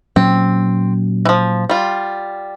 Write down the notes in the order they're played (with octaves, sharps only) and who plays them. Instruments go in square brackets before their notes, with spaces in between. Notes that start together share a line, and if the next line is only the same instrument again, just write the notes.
[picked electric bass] A#2 F#3 C#4 [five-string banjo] C4
[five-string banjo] E3 F3
G3 F4